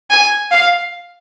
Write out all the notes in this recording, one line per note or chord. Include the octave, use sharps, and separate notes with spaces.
G#5
F5